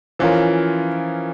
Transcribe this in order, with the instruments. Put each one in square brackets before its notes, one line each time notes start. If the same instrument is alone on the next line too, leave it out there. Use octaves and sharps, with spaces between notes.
[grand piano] E3 [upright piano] F3 C#4 F4 A#4